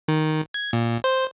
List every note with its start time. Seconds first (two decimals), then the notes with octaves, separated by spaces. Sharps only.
0.08 D#3
0.54 G#6
0.73 A#2
1.04 C5